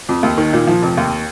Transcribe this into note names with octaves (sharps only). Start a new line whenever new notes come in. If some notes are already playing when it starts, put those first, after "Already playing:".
F2
D#2
D#3
A#2
F3
F1
D#2